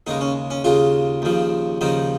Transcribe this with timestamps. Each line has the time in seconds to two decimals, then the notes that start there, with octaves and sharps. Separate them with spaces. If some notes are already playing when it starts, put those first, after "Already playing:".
0.07 D#2 C#3 G#3 D#4
0.21 C#4
0.50 C#4
0.64 D#2 C#3 G#3 F4
1.22 D#2 C#3 F3
1.81 D#2 C#3 F3 D#4